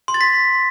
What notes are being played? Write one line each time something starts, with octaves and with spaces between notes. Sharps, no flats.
C6
A6
B6